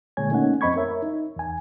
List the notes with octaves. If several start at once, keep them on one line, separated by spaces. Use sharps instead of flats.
A#2 D3 G#3 C#5 G#5 G#6
A3 A#3 C#4 D#4 C#5 F#5
F2 C4 D#5 B5 C#6 G#6
A#4 C#5 E5
D#4
E2 G#5